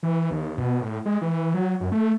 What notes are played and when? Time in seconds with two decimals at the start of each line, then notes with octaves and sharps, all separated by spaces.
0.03 E3
0.31 D#2
0.58 B2
0.81 A2
1.05 G#3
1.22 E3
1.54 F#3
1.80 F#2
1.92 A3